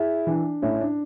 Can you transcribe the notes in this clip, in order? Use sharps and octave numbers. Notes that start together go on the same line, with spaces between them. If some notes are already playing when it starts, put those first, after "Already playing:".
Already playing: E4 G#4
E3 D4
A2 C#4 E4
D4